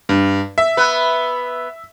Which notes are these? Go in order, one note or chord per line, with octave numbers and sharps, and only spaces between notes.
G2
E5
B3 B4